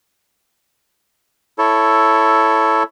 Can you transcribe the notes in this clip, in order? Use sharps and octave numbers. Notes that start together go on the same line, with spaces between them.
E4 A4 C#5